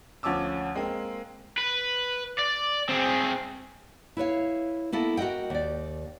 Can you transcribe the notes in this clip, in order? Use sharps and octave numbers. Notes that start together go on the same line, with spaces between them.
D2 F3 C#4 A5 D6 E6
G#3 A#3 C4
B4
D5
C4 G#4
E4 B4 C#5 F5
A#3 B3 E4 A4
F#4 A#4 D#5 F#5 G5
D#2 D5